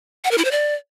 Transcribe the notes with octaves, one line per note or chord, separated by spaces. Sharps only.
F#5
A#4
E4
C5
D5